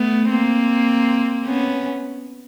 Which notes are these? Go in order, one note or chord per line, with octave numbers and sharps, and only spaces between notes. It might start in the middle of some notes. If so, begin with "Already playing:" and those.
Already playing: A3 B3
A#3 C4
B3 C#4